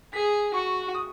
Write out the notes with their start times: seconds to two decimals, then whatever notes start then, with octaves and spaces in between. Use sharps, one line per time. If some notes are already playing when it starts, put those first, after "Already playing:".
0.13 G#4 B6
0.54 F#4 C#6
0.95 D#6